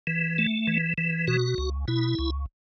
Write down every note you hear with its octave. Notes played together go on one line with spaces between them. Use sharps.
E3
A3
E3
E3
B2 F#4
C#2
B2 E4
C#2